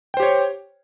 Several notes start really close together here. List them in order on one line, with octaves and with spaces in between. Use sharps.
G5 C5 G4 C#5